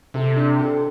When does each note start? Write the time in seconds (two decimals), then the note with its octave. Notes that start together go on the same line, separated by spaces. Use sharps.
0.14 C3 A4
0.36 D4
0.59 A4